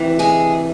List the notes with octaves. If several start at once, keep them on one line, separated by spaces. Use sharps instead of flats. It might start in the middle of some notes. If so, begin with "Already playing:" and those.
Already playing: D2 C3 E3
G#3 G#4